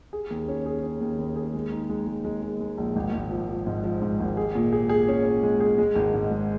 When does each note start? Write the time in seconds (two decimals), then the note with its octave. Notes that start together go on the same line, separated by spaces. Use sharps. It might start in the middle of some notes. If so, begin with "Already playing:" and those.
0.13 G#4
0.31 D#2
0.48 C#4
0.66 G#4
0.83 C#4
1.01 D#2
1.18 D#2
1.36 G#4
1.54 G#3
1.72 D#4
1.90 G#3
2.07 G#3
2.24 G#3
2.42 G#3
2.60 G#3
2.78 A#1
2.96 G#1
3.13 G#1
3.31 F3
3.49 F3
3.67 G#2
3.84 F3
4.02 G#2
4.20 G#1
4.37 G#4
4.55 A#2
4.72 G#4
4.89 G#4
5.08 C#4
5.25 C#4
5.43 G#3
5.60 G#4
5.78 G#3
5.95 G#1
6.14 G#2
6.31 G#3